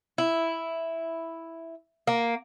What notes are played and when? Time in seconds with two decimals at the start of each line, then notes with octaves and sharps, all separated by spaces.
0.18 E4
2.07 A#3